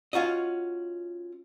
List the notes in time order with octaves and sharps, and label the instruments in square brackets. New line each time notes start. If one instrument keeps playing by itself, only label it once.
[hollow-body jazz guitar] C#4 F4 F#4 D#5